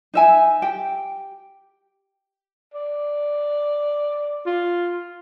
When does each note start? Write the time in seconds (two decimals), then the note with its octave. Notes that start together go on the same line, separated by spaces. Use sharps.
0.14 D#4 E5 G#5
0.62 G4 G5
2.74 D5
4.46 F4